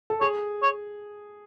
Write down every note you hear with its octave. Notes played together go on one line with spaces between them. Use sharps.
A4
G#4 C#5
C#5